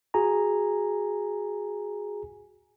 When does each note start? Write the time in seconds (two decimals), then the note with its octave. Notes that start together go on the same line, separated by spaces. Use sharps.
0.14 F#4 G#4 G#5 A#5